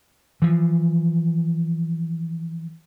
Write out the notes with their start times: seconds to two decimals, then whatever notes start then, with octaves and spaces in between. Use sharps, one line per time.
0.42 E3 F3